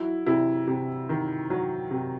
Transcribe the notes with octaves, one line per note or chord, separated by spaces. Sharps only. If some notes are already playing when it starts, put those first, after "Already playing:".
Already playing: F#3 E4
C3 E4
C3
D#3
F#3
C3